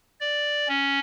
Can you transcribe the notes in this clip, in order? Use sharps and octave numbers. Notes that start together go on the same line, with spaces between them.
D5
C#4